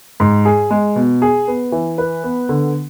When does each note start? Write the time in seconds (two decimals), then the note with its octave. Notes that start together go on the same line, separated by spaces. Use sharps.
0.20 G#2
0.45 G#4
0.71 G#3
0.96 B2
1.22 G#4
1.48 B3
1.72 E3
1.98 B4
2.24 B3
2.49 D3